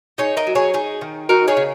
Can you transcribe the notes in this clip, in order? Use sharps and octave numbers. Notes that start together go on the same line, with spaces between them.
D#4 G#4 C#5
A#4 D#5
F#3
G#4 C#5
D#4 G#4
D#3
D#4 F#4 A#4
G#4 C#5
C#3